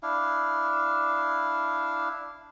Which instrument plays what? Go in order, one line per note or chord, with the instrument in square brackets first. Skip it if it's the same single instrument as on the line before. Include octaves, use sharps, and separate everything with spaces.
[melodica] D4 E4 F5